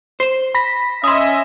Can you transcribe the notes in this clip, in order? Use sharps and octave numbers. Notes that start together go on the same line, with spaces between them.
C5 C7 E7
B5 A#6 B6
C#4 D#5 E5 C6 D#6